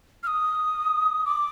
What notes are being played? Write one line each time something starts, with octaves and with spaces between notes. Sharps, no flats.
F6
D#6
D6